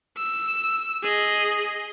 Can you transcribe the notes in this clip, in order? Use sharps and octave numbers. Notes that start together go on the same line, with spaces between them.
E6
G#4 D#5